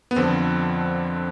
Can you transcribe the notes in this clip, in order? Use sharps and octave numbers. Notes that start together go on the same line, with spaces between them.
B3
F2 D3 F3 C4